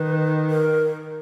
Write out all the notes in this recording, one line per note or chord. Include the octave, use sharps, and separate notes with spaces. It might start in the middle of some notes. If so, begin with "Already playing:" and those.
Already playing: D#3 B4
A#4